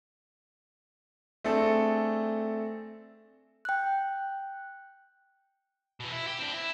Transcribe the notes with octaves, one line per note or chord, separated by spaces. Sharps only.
A3 C4 D4 G#4 A4
G5 F#6
B2 E3
E4
G4
C4 D4
E4